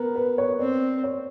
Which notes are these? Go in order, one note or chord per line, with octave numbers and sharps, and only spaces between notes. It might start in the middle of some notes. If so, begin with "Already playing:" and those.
Already playing: B3 A#4 B4
B4
C#5
C4 D5
C#5